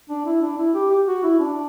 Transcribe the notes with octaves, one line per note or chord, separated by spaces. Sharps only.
D4
E4
D4
E4
G4
G4
F#4
E4
D4